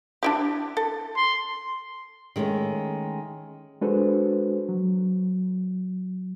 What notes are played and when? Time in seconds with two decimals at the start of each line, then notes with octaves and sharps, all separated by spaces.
0.23 D4 E4 G4
0.77 A4
1.16 C6
2.36 D#3 G#3 A3 C#4
3.81 G#3 D4 F#4 A4 B4 C5
4.69 F#3